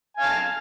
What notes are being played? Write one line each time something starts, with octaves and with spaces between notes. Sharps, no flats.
F5 G#5 A5